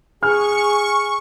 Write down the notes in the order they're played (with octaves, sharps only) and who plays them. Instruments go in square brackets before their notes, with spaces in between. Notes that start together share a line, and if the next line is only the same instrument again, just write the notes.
[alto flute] G#4 [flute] G#5 [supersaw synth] C#6 [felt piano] F6